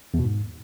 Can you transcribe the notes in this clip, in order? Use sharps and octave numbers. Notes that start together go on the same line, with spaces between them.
E2
B2
G#2